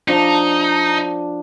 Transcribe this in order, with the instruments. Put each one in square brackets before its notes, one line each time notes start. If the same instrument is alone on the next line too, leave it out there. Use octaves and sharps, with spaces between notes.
[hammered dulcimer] F3 D4 [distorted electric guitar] D#4